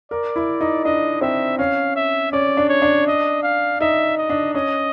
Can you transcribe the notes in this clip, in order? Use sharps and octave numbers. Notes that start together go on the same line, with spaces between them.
A#4 D5
E4
D#4
D4 D#5
C4 E5
C#4 F5
E5
C#4 D5
D4
C#5
D4
D#5
F5
D#4 E5
D#5
D4
C#4 D#5